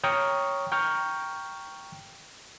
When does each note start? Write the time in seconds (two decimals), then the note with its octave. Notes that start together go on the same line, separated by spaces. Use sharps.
0.04 C#5 G5 A#5 C#6 D#6 F6
0.72 G5 A#5 C#6 F6 G6